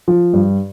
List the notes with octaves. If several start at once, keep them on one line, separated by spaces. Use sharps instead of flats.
F3
G2